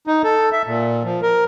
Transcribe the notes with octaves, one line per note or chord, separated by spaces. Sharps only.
D#4
A4
E5
A#2
F3
A#4